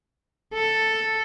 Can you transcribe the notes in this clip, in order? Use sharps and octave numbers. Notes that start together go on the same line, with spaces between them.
A4